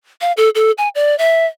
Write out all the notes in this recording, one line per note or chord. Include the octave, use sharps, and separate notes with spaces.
F5
A4
A4
G#5
D5
E5